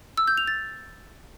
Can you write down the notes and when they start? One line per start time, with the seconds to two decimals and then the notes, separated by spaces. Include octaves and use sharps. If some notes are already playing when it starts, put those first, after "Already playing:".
0.18 E6
0.27 G6
0.37 F7
0.47 A6